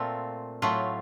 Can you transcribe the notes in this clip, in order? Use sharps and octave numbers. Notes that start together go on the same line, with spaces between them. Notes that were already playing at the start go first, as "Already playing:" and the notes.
Already playing: A#2 A3 C4 F4
A2 F#3 A3 F4